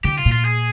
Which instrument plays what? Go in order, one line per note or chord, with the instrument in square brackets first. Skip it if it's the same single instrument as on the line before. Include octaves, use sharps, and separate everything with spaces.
[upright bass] D3 [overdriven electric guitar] G4
[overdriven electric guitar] F4
[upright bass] A#2
[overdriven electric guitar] F4
G#4